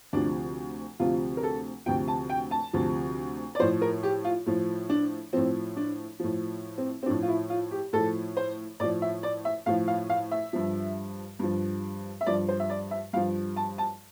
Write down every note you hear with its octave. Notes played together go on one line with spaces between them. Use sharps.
D2 C3 F3 D4
D2 C3 F3 F4
A#4
A4
D2 C3 F3 G5
A5
G5
A5
D2 C3 F3
D5
A2 F3 C5
A#4
G4
F4
A2 F3
D4
A2 F3 C4
D4
A2 F3
C4
C4
A2 F3 D4
F4
E4
F4
G4
A2 F3 A4
C5
A2 F3 D5
E5
D5
E5
A2 F3 F5
F5
F5
E5
G2 F3
G2 F3
E5
G2 F3 D5
C5
E5
D5
E5
G2 F3 F5
A5
A5